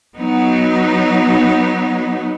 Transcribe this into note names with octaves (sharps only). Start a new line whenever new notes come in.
F#3 B3 D#4